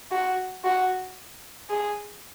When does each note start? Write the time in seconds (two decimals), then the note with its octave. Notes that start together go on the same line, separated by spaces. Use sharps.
0.11 F#4
0.65 F#4
1.69 G#4